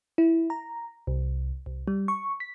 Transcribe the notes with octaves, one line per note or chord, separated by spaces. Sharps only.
E4
A#5
C2
C2
G3
C#6
B6